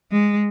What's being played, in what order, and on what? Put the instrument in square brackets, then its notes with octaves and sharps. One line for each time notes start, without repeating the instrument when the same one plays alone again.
[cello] G#3